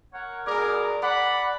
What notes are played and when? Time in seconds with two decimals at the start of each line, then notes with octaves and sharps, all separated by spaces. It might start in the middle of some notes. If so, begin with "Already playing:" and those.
0.14 A#4 C#5 F#5
0.47 B2 B3 G#4 A#4 D5 G#5 D6
1.03 D5 F#5 B5 D6